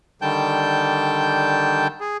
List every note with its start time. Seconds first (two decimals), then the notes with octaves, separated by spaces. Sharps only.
0.22 D3 D#3 G3 G5 A5 G6
2.00 G#4